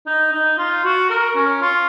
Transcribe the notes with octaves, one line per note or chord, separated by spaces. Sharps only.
D#4
D#4
F4
F#4
A#4
C#4
F4